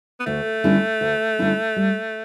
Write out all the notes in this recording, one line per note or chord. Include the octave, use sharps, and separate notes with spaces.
B3
D2 A3
D3 G3 C#4 E4
D2
D3 G3 C#4 E4
G3